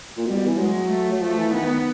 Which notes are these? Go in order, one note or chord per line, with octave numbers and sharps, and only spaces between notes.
A#2
B2 G3
B2
E3
F#3 G#3
A3
F#3
F3 A3
E3
D#3 B3